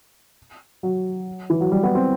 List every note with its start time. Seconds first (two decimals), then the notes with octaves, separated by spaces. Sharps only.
0.83 F#3
1.50 E3
1.61 F#3
1.72 G3
1.83 B3
1.95 C4